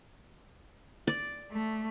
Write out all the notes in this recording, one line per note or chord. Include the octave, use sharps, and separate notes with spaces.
D5
A3